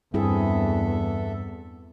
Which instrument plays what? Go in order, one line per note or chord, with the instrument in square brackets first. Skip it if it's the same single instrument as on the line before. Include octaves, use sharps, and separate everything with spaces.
[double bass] E2 [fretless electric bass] G2 [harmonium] B3 A4 E5 [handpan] C4 E4 G#4